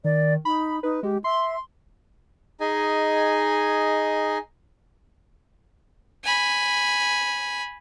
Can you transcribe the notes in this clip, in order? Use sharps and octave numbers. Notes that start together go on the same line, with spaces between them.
D#3 D5
D#4 B5
D#4 B4
G#3 G4
E5 C6
D#4 G#4 D#5 G#5
G#5 B5